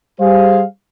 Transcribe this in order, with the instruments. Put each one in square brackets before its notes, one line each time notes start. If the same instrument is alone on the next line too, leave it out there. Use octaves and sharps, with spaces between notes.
[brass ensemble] G3 G#4 C5 F5